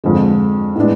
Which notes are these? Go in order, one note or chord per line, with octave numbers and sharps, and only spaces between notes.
F2 D3 G#3
A2 G#3 B3 D4